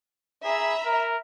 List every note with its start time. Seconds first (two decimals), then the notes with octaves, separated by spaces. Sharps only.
0.44 G#4 E5 A#5 B5
0.86 A#4